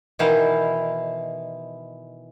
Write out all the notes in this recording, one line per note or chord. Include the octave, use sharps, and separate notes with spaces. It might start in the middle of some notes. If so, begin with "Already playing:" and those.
B2 D#3 E3 E4 C5 F5